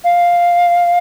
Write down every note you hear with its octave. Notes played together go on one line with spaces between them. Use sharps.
F5